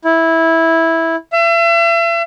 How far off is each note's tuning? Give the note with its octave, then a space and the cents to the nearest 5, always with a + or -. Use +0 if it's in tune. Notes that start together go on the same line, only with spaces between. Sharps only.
E4 -10
E5 +40